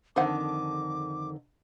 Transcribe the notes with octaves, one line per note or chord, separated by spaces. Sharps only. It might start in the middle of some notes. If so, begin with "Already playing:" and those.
F2 D3 D#3 C5 F#5 D6